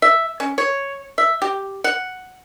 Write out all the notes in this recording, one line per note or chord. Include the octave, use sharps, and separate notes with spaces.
E5
C#4
C#5
E5
G4
F#5